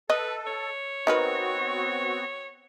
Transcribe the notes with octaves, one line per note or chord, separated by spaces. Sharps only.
A4 B4 D#5
C#5
B3 C4 D#4 F#4 A#4 B4